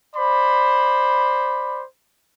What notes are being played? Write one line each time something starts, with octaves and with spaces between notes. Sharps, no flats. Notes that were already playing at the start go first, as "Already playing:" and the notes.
C5 D5 B5